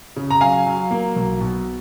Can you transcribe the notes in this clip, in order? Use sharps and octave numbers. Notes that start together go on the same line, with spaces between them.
C#3
A#5
F#3 F5 G#5
F#3
A#3
B1
B2